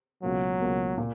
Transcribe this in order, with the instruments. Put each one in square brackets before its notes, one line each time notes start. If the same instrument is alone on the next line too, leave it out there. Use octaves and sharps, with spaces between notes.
[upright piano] C#2 B2 A#3 [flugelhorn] F#3
[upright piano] C#2 B2 A#3
A#2